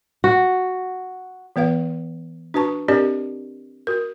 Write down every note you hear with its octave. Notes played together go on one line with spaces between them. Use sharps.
F#4
E3 B3 B4 F5
D4 F#4 B4 A5 C#6
C4 D4 G4 A#4 D5 D#5
F#4 A#4